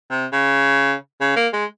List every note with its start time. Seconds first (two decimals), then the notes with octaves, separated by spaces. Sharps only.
0.11 C3
0.33 C#3
1.21 C#3
1.36 A#3
1.53 G#3